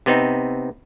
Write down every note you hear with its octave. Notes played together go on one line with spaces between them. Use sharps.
C3 B3 C4 D#4